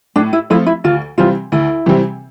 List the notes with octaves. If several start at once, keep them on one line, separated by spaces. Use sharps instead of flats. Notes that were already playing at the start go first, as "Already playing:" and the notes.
A2 D4
E4
F3 A3 C4 E4 F4
E4
D2 F4
C3 E3 G3 C4 F4
D2 E4
C3 E3 G3 C4